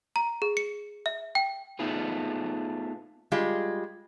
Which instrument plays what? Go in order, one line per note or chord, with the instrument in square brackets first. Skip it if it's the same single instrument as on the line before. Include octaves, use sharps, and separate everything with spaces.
[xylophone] A#5
G#4
C#7
E5
G5
[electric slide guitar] A3 B3 D#4 F4 G#4 B4
[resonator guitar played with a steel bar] G3 G#3 F4